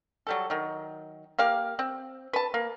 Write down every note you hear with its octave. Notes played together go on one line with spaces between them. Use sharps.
F#3 G3 A4
D#3 F#3
A#3 G4 F5
C4
B4 A5
A#3